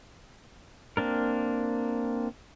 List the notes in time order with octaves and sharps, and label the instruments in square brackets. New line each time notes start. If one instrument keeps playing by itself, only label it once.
[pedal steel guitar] A#3 C4 D4 A#4